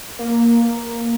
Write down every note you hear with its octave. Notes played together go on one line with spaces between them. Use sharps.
A#3
A#3